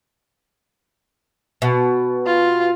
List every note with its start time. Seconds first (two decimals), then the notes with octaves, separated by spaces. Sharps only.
1.62 B2
2.26 F4